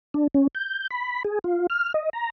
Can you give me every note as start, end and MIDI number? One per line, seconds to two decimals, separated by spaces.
0.14 0.27 62
0.34 0.47 61
0.55 0.87 91
0.91 1.23 83
1.25 1.39 68
1.44 1.67 65
1.70 1.93 89
1.94 2.09 75
2.13 2.30 82